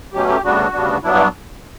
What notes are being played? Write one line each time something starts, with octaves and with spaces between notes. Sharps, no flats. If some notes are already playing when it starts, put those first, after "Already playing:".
B2 F#3 A3 C#4 G4
G4
D2 C#3 G3 B3 D4 F#4
D2 C#3 G3 B3 D4
G2 F#3 B3 D4 E4
E4